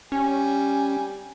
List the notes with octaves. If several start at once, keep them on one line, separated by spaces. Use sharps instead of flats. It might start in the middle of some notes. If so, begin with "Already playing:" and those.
G3 C#4 G#5